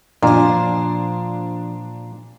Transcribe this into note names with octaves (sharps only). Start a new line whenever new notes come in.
A#2 F3 D4 C5